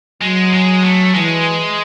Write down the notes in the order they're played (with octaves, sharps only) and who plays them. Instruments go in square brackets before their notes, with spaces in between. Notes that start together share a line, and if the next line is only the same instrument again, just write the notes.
[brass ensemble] F#3 [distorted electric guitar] G#3
[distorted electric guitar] G#3
A3
[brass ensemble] E3 [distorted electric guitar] G#3